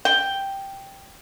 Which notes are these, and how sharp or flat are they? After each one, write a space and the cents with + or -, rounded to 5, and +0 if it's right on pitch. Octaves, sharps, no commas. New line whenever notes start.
G5 +0